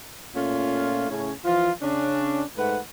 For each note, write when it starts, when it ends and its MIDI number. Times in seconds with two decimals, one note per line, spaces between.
0.35 1.08 46
0.35 1.08 57
0.35 1.08 61
0.35 1.08 65
1.10 1.32 45
1.10 1.32 49
1.10 1.32 61
1.45 1.71 52
1.45 1.71 53
1.45 1.71 65
1.82 2.43 49
1.82 2.43 61
1.82 2.43 62
2.57 2.79 44
2.57 2.79 57
2.57 2.79 71
2.57 2.79 78